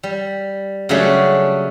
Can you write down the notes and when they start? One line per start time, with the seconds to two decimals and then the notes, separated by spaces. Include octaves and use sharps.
0.03 G3
0.89 C#3 F#3 G3 A3 C#4 D4